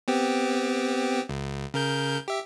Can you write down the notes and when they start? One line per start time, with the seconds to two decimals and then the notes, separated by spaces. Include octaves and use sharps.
0.08 B3 C4 G4
1.29 C#2
1.74 C#3 A#4 G6
2.28 G4 E5